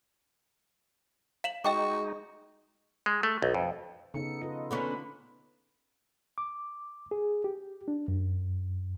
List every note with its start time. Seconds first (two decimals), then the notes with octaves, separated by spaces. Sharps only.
1.44 F5 E7 F#7
1.65 G#3 D#4 F#4 D#5 G5 D6
3.06 G#3
3.23 A3
3.42 B1
3.54 F2
4.14 C#3 B3 D#4 A4 C#7
4.42 F4 A4 B4 D#5
4.71 D3 B3 C#4 B5
6.38 D6
7.11 G#4
7.44 G4
7.88 D4
8.08 F#2